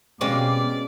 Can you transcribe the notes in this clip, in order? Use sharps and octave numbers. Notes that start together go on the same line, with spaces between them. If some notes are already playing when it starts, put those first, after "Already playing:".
B2 G#3 C4 C#4 G4 D5 F5 D6